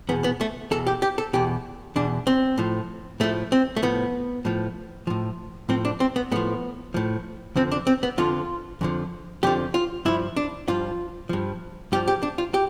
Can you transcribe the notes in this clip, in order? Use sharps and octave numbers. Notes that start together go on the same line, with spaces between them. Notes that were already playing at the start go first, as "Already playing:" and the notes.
E2 B2 B3
B3
A3
E2 B2 A4
G4
G4
A4
E2 B2 G4
E2 B2 D4
C4
A2 F3
A2 F3 A3
C4
A3
A2 F3 B3
A2 F3
A2 F3
A2 F3 C4
D4
C4
B3
A2 F3 B3
A2 F3
F2 D3 F3 C4
D4
C4
B3
F2 D3 F3 F4
F2 D3 F3
F2 D3 F3 G4
F4
G2 F3 E4
D4
G2 F3 F4
G2 F3
G2 F3 G4
G4
D4
F4
G4